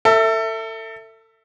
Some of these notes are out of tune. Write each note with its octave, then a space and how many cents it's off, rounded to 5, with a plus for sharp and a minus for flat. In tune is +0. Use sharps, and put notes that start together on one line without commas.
A4 +30 E5 +0